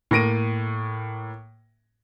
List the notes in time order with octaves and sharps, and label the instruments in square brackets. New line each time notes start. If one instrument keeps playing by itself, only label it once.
[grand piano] A2 A#3 A#6 D7 D#7